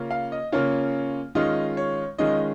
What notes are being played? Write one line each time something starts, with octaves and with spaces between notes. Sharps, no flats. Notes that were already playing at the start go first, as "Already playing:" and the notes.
Already playing: C#3 A#3 C#4 F4
F5
D#5
C#3 A#3 C#4 F4 C#5
D#3 G#3 C#4 F4 D#5
C#5
D#3 G#3 C#4 F4 D#5